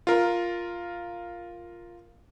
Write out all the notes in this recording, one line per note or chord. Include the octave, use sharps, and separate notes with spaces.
F4 A#4